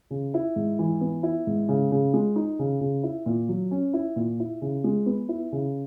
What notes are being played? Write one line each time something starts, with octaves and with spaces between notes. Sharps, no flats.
C#3
E4
G#2
E3
B3
E4
G#2
C#3
C#3
G#3
D#4
C#3
C#3
E4
A#2
F#3
C#4
E4
A#2
E4
C#3
G#3
B3
E4
C#3